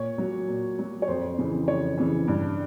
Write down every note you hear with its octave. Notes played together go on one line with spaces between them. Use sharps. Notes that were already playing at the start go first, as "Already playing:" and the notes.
Already playing: A#2 C#5
F#3
A#2
F#3
C#5
F2 C5
C#3 E3
F2 C#5
C#3 E3
G2